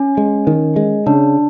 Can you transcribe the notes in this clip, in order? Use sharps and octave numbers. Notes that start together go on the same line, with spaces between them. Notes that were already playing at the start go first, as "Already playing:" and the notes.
Already playing: C#4
G#3
D#3
G#3
C#3 D4